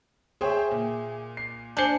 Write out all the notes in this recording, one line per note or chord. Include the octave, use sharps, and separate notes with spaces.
G#4 C5 C#5 E5 G5
A#2
C7
D4 C5 G#5 G6 C#7 G7